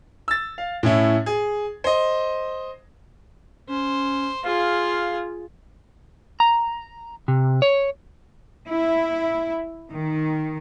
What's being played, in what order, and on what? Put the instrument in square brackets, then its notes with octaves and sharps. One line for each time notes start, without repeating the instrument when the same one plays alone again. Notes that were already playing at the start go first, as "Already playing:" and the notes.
[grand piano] E6 A6
F5
A2 C#4 E4
G#4
C5 D#5
[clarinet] C#4 [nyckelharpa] C5
[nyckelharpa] F4 G#4 [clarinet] F5
[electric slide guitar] A#5
C3
C#5
[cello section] E4
D#3